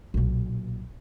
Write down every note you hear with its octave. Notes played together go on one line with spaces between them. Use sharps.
B1 A#2